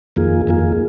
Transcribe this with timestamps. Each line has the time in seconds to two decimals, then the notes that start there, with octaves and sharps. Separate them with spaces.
0.16 F2 D#3 A#3 F4 G#4
0.47 F2 D#3 A#3 F4 G#4